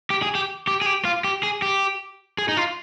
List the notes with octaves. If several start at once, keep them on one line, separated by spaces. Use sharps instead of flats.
G4
G#4
G4
G4
G#4
G4
F4
G4
G#4
G4
G#4
D#4
F4